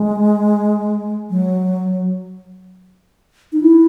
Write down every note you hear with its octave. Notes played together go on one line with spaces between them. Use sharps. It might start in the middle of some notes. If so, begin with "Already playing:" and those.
Already playing: G#3
F#3
D#4
E4